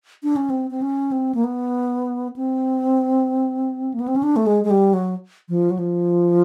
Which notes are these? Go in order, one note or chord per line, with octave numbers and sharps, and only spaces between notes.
D4
C#4
C4
C4
C#4
C4
A#3
B3
C4
A#3
B3
C4
C#4
D4
A3
G#3
G#3
G3
F#3
F3
F#3
F3